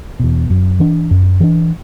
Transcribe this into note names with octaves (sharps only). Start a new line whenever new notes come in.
E2 B2
F#2
E3 D4
F#2
E3 D4